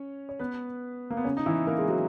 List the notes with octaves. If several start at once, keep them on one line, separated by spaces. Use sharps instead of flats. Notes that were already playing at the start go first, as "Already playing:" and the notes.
Already playing: C#4 C#5
C#5
B3 B4
A#3
B3
C#3 C#4
D#4
E3 E4
A#3 A#4
G#3 G#4
F#3 F#4